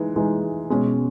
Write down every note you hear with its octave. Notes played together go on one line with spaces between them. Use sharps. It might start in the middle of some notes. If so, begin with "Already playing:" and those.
Already playing: E3 G#3 D#4
E3 G#3 D#4
B2 G#3 C#4